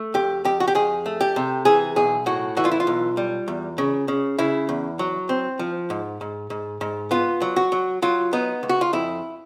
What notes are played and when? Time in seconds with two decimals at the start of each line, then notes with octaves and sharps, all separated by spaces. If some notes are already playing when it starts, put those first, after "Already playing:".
Already playing: A3
0.14 F2 G4
0.45 F2 G4
0.60 F#4
0.68 G4
0.75 F2 G#4
1.06 A3
1.21 G4
1.36 C3
1.65 E3 G#4
1.96 B1 G#4
2.26 A2 F#4
2.57 E3 F#4
2.65 F4
2.71 E4
2.80 F4
2.87 B1
3.17 G3
3.48 E2
3.78 C#3
4.08 C#3
4.39 C#3 E4
4.69 E2
4.99 F#3
5.29 C4
5.59 F3
5.90 G#2
6.21 G#2
6.50 G#2
6.81 G#2
7.11 B3 F4
7.42 F#3
7.56 F#4
7.72 F#3
8.02 F#3 F4
8.33 B3 D#4
8.63 C#2
8.69 F#4
8.81 F4
8.93 F2 E4